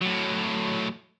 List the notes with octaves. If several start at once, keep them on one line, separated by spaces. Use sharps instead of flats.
A2 F#3